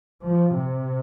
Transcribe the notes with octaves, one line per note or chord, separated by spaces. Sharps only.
F3
C3